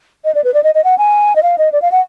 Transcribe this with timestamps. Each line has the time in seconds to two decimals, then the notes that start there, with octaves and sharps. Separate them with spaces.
0.25 D#5
0.35 D5
0.44 B4
0.54 D5
0.64 D#5
0.75 D#5
0.84 F#5
0.98 G#5
1.36 D#5
1.43 F5
1.58 D#5
1.72 D5
1.82 F5
1.92 F#5